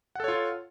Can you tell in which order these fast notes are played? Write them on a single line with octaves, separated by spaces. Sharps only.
F#5 A4 C#5 F4